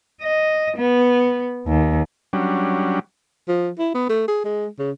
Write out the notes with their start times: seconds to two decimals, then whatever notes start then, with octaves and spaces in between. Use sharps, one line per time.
0.21 D#5
0.77 B3
1.66 D#2
2.33 F#3 G3 C#4 D4
3.48 F3
3.79 E4
3.95 B3
4.09 A3
4.28 G#4
4.44 G#3
4.79 C#3